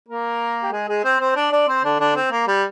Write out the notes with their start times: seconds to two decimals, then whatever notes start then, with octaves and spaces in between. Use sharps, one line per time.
0.09 A#3 A#4
0.63 G4
0.72 G#3 G#4
0.89 G#3 G#4
1.04 C4 C5
1.20 C4 C5
1.35 D4 D5
1.52 D4 D5
1.68 C4 C5
1.84 D3 D4
2.00 D3 D4
2.16 C4
2.31 A#3
2.47 G3